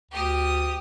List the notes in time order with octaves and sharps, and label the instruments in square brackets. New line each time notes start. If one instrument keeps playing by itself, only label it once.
[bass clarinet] D2 [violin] G4 D#6